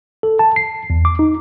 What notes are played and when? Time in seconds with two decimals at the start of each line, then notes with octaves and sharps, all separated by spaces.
0.23 A4
0.39 A5
0.56 C7
0.90 E2
1.05 D6
1.19 D#4